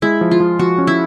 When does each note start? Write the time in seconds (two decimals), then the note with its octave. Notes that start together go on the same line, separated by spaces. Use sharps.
0.02 G#3 E4
0.21 F3
0.31 F4
0.40 F3
0.59 F3 F#4
0.78 C#4
0.87 E4